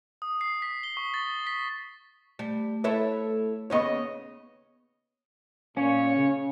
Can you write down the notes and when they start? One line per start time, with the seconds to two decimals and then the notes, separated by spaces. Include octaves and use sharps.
0.22 D#6
0.41 C7
0.62 B6
0.83 G7
0.97 C#6
1.14 A6
1.47 B6
2.39 G3 A3
2.84 E4 A4 B4 C#5 E5
3.70 D#2 C#3 B3 C#5 D#5 C#6
5.77 A#2 C#4 C#5 F5
6.16 C#3